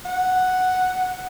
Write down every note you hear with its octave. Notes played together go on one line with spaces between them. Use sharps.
F#5